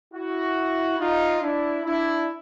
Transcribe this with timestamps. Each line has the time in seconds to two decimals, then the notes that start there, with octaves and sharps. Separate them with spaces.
0.14 E4 F#4
0.99 D#4 F4
1.42 D4 E4
1.84 D4 E4